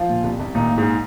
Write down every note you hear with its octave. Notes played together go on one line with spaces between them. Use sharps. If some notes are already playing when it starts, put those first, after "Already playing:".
Already playing: F3 F4
A#2
C2
C2
A#2 D#3 D#4
A#2
G#2 G#3